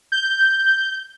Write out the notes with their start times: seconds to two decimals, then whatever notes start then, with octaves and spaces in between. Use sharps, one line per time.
0.12 G6